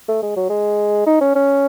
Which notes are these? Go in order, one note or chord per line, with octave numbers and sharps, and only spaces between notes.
A3
G#3
F#3
G#3
D#4
C#4
C#4